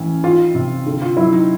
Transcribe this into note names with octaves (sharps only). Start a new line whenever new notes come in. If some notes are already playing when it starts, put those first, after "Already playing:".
Already playing: A1 C#4
D#3 F4
C3
D3
F4
F#3 E4
D#4